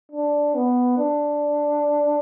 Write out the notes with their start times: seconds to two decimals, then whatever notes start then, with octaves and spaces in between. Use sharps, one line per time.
0.12 D4
0.55 B3
0.98 D4